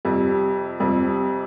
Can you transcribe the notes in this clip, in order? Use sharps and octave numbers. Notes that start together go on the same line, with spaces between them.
F2 C3 G3
F2 C3 G3